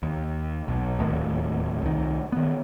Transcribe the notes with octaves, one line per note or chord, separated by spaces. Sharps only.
D#2
B1
D1 G#1 D#2 A2
C2 D#3
D#3 B3